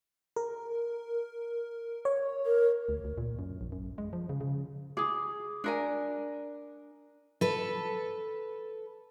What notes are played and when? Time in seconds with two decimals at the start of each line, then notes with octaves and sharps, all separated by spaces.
0.36 A#4
2.05 C#5
2.46 A#4
2.89 D2
3.05 D2
3.18 A#2
3.39 F#2
3.61 A#1
3.72 F#2
3.98 G#3
4.13 F3
4.29 C#3
4.41 C#3
4.97 G#4 D6 D#6
5.64 D4 A#4 G#5
7.41 A4 B4